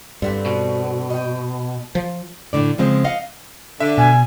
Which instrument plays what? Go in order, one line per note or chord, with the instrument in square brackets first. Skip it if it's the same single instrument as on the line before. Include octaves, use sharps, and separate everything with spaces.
[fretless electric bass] G2 [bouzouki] D3 B3 C4
[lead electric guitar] B2
[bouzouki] D#5 G5
[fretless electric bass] F3
[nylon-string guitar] A2 D3 D5
C#3 F3 G#3 C4
D#5 F5 F#5
[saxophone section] D3 [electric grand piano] E5
[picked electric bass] B2 [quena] G#5